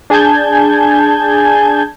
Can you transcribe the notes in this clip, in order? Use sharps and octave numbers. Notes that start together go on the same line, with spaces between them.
D4 G#4 G#5 A5 G6 G#6